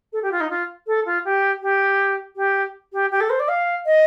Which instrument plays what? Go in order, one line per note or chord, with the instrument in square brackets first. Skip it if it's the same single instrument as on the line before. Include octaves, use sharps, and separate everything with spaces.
[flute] A4
G4
F4
D#4
F4
A4
F4
G4
G4
G4
G4
G4
A4
C5
D5
F5
D#5